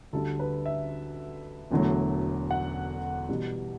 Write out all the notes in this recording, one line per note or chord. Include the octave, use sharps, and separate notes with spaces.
D2 D3 G3 A4
B4
E5
E1 E2 D3 F#3 A3
F#5
E2 B2 G3